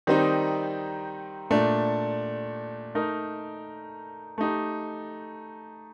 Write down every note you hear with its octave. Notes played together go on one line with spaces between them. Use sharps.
D#3 G3 C4 D#4
A#2 A3 D4
A3 D#4 A#4
A3 D#4 G4